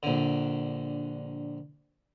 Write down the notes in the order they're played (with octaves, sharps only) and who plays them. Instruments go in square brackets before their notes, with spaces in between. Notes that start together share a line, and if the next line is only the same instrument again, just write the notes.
[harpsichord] A#1 D3